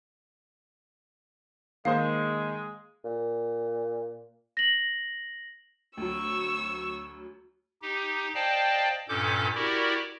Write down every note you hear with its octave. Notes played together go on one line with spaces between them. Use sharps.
D#3 G#3 A#3 C5 F5
A#2
A#6 F#7
D2 F#3 C#6 E6
D#4 G4
C5 D5 D#5 F5 G5 A5
G2 A#2 C#4 A4 D6 G6
E4 F#4 G4 A#4 D5